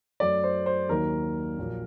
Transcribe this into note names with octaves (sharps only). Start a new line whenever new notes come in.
F#2 F#3 A3 D5
C5
C5
D#2 D#3 F#3 A#3 A#4
A#1 A#2 F#3